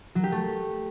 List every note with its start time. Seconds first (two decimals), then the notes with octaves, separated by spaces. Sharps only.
0.15 F#3
0.24 G4
0.32 A3